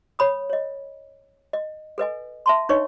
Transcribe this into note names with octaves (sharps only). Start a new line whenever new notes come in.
C#5 B5 D#6
C#5 D#5
D#5
A4 B4 D#5 G#5
E5 A5 C6
D4 D#4 B4 C#5 D#5 C#6